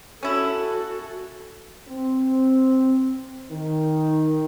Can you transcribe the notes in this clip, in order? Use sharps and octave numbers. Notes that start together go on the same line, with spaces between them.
C#4 E4 F#4 A4
C4
D#3